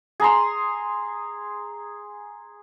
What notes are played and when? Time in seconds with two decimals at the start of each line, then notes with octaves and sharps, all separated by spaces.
0.20 G#4 A#5 C6